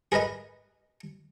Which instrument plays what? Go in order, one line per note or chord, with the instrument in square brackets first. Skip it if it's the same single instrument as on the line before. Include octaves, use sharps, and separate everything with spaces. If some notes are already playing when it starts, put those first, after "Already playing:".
[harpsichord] G#4 A#4 B4 D#5 A#5